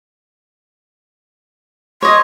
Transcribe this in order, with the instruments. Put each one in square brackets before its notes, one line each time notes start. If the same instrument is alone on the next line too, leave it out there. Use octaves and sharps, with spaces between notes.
[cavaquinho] C#5 D#5 [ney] C6